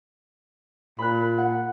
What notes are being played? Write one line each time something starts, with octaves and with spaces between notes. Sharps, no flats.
A#2 B5 F#6
F#5